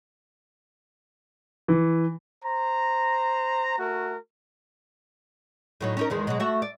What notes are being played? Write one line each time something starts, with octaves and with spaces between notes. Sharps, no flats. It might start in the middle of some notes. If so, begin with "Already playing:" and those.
E3
C5 A#5
A3 F#4 A#4
A2 F#3 D#4
C#4 D#4 A#4
E2 D#3 G#3
B2 F#3 G#3
A3 F#4 E5
D5